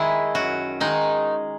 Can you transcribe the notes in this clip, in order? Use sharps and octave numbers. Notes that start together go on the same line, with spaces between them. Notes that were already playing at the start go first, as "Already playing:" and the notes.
Already playing: D#3 G#3 E4
F#2 F#4
D#3 G#3 D#4